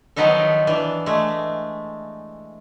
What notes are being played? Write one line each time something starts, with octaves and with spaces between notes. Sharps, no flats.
D#3 F3 F#3 B3 D#4 A4
E3 D4
G#3 A3